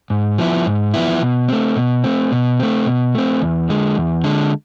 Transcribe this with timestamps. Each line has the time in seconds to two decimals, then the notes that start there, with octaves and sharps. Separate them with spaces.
0.10 G#2
0.38 F3 B3 E4
0.66 G#2
0.94 F3 B3 E4
1.22 B2
1.48 A3 C4
1.76 B2
2.04 A3 C4
2.32 B2
2.59 A3 C4
2.86 B2
3.15 A3 C4
3.42 E2
3.69 D3 G#3
3.97 E2
4.24 D3 G#3